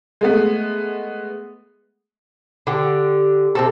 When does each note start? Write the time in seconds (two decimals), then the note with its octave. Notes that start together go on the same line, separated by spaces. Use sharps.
0.21 G#3 A3 B3
2.67 D3 G4
3.55 C3 C4 A4